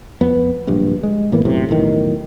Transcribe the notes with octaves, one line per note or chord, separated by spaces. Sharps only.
F2 B3
D1 A#1 G2
G#3
A2 E3 A#3 B3
B1 F#2 A2 C3
B1 E2 A2 D#3